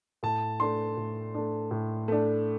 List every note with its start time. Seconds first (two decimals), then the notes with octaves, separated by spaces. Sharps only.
0.23 A2 A5
0.60 A3 D4 C6
0.97 A2
1.34 A3 D4
1.71 A2
2.08 A3 D4